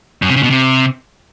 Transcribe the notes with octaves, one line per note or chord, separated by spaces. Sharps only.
F#2
C3
C#3
B2
C3